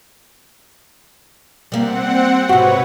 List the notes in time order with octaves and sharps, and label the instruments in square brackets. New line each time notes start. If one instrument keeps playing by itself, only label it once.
[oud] G3 A#3 [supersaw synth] C4 F#5
[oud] G#2 C3 [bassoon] F#4 [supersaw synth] B4 C#5